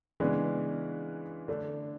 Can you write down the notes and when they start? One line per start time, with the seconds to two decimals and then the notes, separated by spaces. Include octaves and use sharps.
0.20 C#3 E3 G#3 B3 D4
1.48 D3 A3 D4